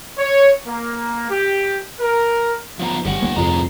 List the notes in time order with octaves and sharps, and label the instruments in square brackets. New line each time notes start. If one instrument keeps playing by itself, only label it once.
[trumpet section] C#5
A#3
G4
A#4
[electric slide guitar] F3 B3 A#5
[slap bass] G1 C#3 [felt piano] G3 [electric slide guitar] G4 F#5
[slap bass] D1 A#3 B3
[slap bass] C2 [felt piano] F2 [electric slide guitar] A2 G#4 A#5